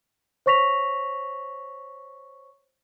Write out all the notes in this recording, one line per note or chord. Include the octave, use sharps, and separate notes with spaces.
C5 C#5 C#6 A#6 B6 F7